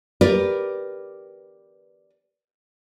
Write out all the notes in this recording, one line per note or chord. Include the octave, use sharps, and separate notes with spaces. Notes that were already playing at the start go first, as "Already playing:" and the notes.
G4 A#4 B4 D5